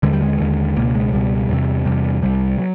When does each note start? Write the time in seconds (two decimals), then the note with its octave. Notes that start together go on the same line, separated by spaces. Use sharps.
0.03 D#2 D3 G#3
0.13 G3
0.22 G#3
0.39 D#2 D3
0.76 C#2 B2 A#3
0.95 G#3
1.12 C#2 B2 G3
1.49 E2 C3
1.85 E2 C3 G3
2.22 C2 C3 G3
2.59 F#3